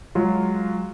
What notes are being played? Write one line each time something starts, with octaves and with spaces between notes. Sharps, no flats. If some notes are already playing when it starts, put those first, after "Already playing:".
F#3 G#3 F4